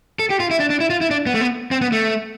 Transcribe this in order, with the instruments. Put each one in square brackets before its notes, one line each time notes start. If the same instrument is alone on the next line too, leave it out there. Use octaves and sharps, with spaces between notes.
[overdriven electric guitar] A4
G4
F4
E4
D4
D4
E4
F4
E4
D4
B3
A3
B3
C4
B3
A3